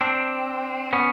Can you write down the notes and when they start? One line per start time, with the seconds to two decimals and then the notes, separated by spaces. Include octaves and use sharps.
0.01 C4 D4
0.93 B3 C#4